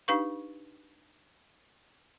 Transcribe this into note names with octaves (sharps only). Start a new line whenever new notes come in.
D4 D#4 G4 B4 F5 C#6